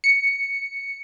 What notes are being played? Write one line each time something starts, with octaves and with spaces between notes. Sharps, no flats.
C#7